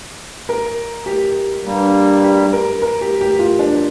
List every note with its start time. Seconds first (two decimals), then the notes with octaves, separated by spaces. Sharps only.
0.49 A#4
1.06 G4
1.65 G2 G3 A#3
2.23 G4
2.53 A#4
2.82 A#4
3.01 G4
3.21 G4
3.39 F4
3.59 D4